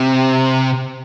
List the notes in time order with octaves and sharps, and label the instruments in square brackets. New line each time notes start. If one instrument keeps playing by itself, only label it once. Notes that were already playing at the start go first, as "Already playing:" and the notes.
Already playing: [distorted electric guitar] C3